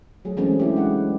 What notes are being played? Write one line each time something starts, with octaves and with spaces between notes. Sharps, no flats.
F#3 A3 G#4
E3 F#3 G#3 A3 C4 C#4
D4 E4 G4
G#3 F#5